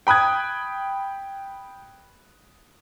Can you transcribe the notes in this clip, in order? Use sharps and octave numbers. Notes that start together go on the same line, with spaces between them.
G5 B5 D#6 F#6 G#6